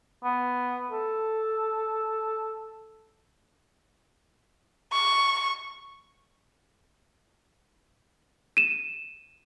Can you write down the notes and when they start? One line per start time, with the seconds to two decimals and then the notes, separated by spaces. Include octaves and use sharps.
0.24 B3
0.91 A4
4.92 C#6
8.57 D#7 E7